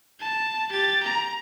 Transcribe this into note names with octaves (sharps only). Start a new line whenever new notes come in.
A5
G4 A6
A#5